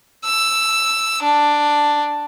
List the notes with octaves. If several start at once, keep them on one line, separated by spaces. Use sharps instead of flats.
E6
D4